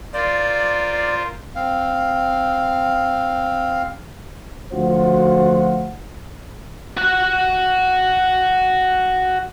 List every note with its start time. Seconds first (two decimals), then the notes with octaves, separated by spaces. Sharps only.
0.13 F4 A#4 C5 D5
1.55 C4 F5
4.72 D2 F3 F4 F#4 C5 F#5
6.97 F#4 F#5